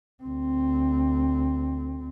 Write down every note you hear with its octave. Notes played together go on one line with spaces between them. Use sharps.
D2 C4